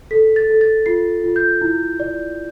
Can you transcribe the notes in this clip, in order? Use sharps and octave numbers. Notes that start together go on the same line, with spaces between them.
A4 B6
A6
A4
A6
F4 C7
F4
G6
E4
D5